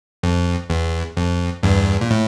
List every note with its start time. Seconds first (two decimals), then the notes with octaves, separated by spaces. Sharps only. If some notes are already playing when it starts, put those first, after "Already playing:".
0.23 F2
0.70 E2
1.17 F2
1.63 E2 G2
2.01 A#2
2.11 A2